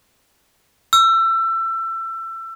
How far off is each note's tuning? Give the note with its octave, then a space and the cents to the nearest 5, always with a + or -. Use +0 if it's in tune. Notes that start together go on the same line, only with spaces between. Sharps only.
E6 +25